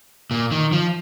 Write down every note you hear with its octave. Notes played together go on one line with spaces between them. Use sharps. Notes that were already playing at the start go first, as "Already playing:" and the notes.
A#2
D#3
F3